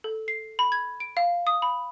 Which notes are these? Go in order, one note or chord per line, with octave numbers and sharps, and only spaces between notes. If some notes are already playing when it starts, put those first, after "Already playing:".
A4
C7
B5
G#6
D7
F5
D#6
B5